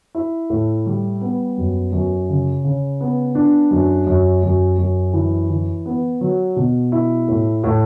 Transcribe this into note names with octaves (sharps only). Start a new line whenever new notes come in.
E4
A2
G3
B3
F#2
F#2
C#3
C#3
B3
D4
F#2
F#2
F#2
F#2
E3
E3
B3
F#3
B2
E4
A2
A2